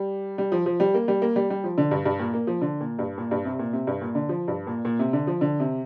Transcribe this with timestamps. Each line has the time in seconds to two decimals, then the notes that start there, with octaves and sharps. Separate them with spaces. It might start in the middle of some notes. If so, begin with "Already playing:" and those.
Already playing: G3
0.38 G3
0.52 F3
0.66 F3
0.80 G3
0.94 A#3
1.08 G3
1.22 A#3
1.36 G3
1.50 G3
1.64 F3
1.78 D3
1.91 G2
2.06 G2
2.19 A#2
2.34 A#3
2.47 F3
2.62 D3
2.81 A#2
2.99 G2
3.18 A#2
3.31 G2
3.45 C3
3.59 A#2
3.73 C3
3.87 G2
4.01 A#2
4.15 D3
4.29 F3
4.48 G2
4.67 A#2
4.85 A#2
4.99 C3
5.13 D3
5.27 F3
5.41 D3
5.60 C3